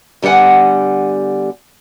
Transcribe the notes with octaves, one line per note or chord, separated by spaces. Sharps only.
D3 G3 B3 F#5 G#5